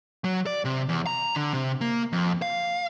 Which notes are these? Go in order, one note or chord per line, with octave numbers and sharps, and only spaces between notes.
F#3
D5
C3
E2
A#5
D3
C3
A#3
F2
F5